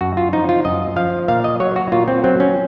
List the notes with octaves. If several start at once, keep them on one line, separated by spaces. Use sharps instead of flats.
F#2 F#4
F4
F3 D#4
F4
F#2 D#5
F3 F5
A#2 F5
D#5
F#3 C#5
F#4
A#2 F4
C4
F#3 C4
C#4